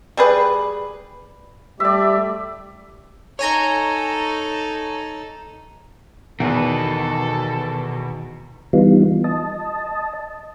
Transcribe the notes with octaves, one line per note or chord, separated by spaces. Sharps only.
G3 G#4 B4
G3 A3 G4 D5 E5
D#4 A4 C#5 G#5 A#5
E2 B2 D#3 A4 B4
E3 G3 B3 D#4 F4
D#5 A5